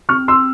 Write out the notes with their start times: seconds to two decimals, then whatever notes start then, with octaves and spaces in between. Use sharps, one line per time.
0.09 C4 C#6 F6
0.28 C6 E6